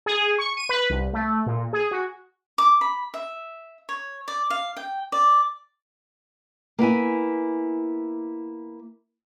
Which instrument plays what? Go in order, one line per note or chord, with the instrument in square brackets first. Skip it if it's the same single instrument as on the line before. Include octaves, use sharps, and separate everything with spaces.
[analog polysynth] G#4
C#6
D#7
B4
C2
A3
A#2
G#4
F#4
[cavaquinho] D6
B5
E5
C#5
D5
F5
G5
D5
[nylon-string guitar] A#3 B3 E4 G#5